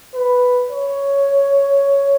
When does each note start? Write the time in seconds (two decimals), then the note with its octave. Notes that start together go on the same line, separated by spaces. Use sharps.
0.15 B4
0.70 C#5